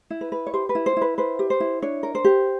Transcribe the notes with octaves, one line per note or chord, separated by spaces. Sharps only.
E4
B4
B4
C#5
G4 C5
B4
E4
C5
E4 B4
B4 C5
G4
C5
E4
D4 C#5
A#4
C5
G4